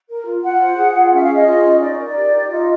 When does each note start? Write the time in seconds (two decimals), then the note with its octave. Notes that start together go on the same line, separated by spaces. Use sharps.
0.09 A#4
0.26 F4
0.44 F4 F#5
0.61 C5
0.77 G#4
0.94 F4
1.12 C#4 E5
1.23 F5
1.29 G#4
1.35 D#5
1.46 F4
1.63 C#4
1.81 D#4 D5
1.92 D5
1.98 A#4
2.04 D5
2.16 G4
2.34 D#4
2.50 F4 D#5